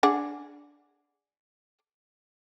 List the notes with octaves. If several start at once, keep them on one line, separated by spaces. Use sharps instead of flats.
D4 G#4 F#5